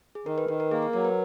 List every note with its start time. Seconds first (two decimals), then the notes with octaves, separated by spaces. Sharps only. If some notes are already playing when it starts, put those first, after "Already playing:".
0.15 G#4
0.26 D#3 A#4
0.38 B4
0.48 D#3 A#4
0.60 A#4
0.71 A#3 G#4
0.83 A#4
0.93 F#3 A#4
1.05 B4